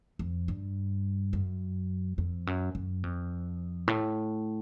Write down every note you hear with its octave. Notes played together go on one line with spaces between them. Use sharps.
F2
G2
F#2
F2
F#2
F#2
F2
A2